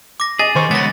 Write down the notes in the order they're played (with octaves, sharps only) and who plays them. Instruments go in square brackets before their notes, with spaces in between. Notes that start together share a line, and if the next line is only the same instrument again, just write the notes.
[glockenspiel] D6 A#6
[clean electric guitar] G#4 [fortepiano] D#5 [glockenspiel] A6
[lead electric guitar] D#3 [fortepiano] C5 C#6
[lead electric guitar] G#3 C#5 [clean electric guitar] B3 [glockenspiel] A6 A#6